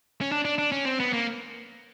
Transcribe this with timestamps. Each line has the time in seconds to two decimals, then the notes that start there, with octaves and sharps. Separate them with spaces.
0.21 C#4
0.32 D4
0.45 D4
0.58 D4
0.72 C#4
0.85 C4
1.00 B3
1.13 A#3